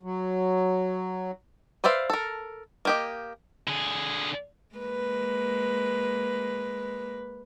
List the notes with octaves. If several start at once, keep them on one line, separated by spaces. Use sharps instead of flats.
F#3
B4 C5 D5 E5 F5
A4 A#4
A#3 G4 D#5
D3 G#4
G#3 A#3 B4